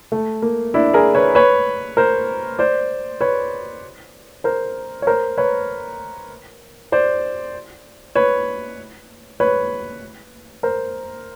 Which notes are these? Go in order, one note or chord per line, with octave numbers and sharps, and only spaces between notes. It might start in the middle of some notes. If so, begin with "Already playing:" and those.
A3
A#3
D4 E4
G#4 A#4
B4 C#5
B4 C#5
A#4 C5
C5 D5
B4 C#5
A#4 C5
C#5
A#4 C5
B4 C#5
C5 D5
B4 C#5
B4 C#5
A#4 C5